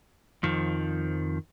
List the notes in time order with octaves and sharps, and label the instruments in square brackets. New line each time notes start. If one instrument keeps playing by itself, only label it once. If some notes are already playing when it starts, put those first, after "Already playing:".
[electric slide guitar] F2 D#3 F3